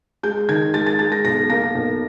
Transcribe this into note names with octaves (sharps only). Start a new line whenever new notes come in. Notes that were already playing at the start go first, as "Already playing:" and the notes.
G#3 G6
D#3 G#6
G#3 A6
A6
G#3 A6
A#6
B1 A#6
A#3 A#6
B1